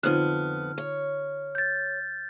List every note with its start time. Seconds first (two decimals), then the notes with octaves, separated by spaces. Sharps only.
0.03 F2 D3 B3 D#4 F4 F6
0.78 C#5
1.55 G6 A6